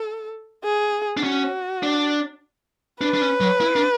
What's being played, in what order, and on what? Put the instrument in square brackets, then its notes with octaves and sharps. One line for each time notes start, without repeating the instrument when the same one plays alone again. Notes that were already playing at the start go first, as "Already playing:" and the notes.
Already playing: [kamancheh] A4
G#4
[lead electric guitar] D4
[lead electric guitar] C#4 [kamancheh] F#4
[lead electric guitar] D4
[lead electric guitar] D4 [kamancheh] B4
[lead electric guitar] D4
C#4
F#3
E4
D4